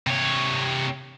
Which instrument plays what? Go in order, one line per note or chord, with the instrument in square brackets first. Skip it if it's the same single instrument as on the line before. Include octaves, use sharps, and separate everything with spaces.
[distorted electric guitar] C3 C#5